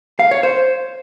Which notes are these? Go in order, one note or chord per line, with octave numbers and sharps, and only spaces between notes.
F5
C#5
C5